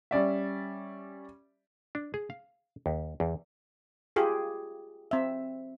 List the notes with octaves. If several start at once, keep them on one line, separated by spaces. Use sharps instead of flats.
G3 C#4 D5 E5
D4
G#4
F5
D#2
E2
F4 G4 G#4
C4 E5